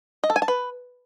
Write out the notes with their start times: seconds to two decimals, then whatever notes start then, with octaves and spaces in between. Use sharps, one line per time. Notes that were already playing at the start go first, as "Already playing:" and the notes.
0.24 D#5
0.30 A4
0.36 G#5
0.42 A5
0.48 B4